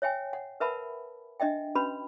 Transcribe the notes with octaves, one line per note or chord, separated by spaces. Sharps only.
C#5 E5 G5 G#5
F#5
A#4 B4 E5 F#5 A5 B5
D4 D#5 E5 G5
C#4 F#4 B4 B5